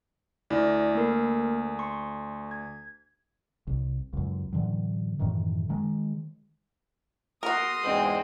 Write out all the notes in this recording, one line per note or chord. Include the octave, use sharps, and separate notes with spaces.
D2 E4 D5
A#3 A#4
C6 C#6
G#6
C2
C#2 F#2
A2 D3 E3 F#3
F#2 A2 D#3 E3
D#3 G#3
F#4 A#4 C6 D#6
E2 G#2 G#3 C4